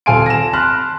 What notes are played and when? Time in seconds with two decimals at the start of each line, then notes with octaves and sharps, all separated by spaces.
0.06 D#1 A4 F5 G#5 C6 D7
0.26 A#6 E7
0.53 A5 B5 C6 F6 F#6